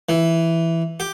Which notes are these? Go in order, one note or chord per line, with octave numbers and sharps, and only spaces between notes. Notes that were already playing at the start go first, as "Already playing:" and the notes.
E3
G4